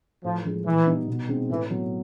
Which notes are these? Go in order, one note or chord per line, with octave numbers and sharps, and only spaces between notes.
A2 F3
F3 G#3
A#2 E3
G3 B3 D#4
B2
G#3 C4 D#4
A2 E3
F#3 B3